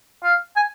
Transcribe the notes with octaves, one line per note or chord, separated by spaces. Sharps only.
F5
G#5